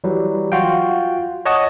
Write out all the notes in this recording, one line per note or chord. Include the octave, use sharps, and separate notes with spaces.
E3 F#3 G3
F4 F#4 F5 G5
C#5 D#5 F#5 A5 C#6 D#6